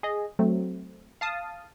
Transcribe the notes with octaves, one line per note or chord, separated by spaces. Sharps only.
G#4 D#5
F#3 A3 C4
F5 A5 D#6